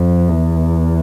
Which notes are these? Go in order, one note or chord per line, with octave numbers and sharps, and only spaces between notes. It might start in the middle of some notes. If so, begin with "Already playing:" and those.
Already playing: F2
E2